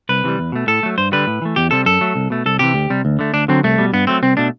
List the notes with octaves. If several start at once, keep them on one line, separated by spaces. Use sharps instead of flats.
C2 B4
C3 E3 G3
E2
B2 A3
A2 A4
F#3 A3
G2 C5
D3 G3 B4
A2
E3 A3
E2 G4
C3 G3 A4
F#2 A4
F#3 A3
C2
B2 A3
C2 A4
C3 E3 G4
D2
C3 G3
D2
D3 A3
D2 D4
D3 F#3 C4
C2 A3
B2 G3
G2 B3
F#3 A3 C4
C2 C4
B2 A3 D4